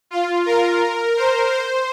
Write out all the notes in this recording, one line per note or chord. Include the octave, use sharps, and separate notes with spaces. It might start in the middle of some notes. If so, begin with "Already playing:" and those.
F4
A#4
C5
C5